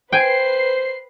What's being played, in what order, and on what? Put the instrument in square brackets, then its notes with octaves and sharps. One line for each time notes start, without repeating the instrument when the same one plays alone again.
[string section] B4 C7 [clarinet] C5 [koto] G5 G#5